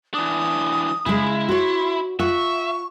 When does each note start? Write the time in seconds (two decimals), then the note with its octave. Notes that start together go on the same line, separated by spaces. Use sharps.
0.14 E3 D4 D#6
1.06 C#3 G#3 E4
1.49 F#4 C#5 C6
2.19 F4 C#5 E5 F#5 C#6